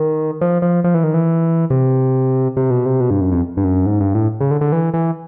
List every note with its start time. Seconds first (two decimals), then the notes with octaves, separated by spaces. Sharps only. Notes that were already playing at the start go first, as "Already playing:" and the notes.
Already playing: D#3
0.41 F3
0.62 F3
0.84 F3
0.94 E3
1.04 D#3
1.14 E3
1.70 C3
2.57 C3
2.70 B2
2.85 C3
3.00 B2
3.10 G2
3.21 F#2
3.32 F2
3.57 G2
3.64 F#2
3.86 G#2
4.00 G2
4.15 A2
4.41 C#3
4.51 D3
4.61 D3
4.72 E3
4.94 E3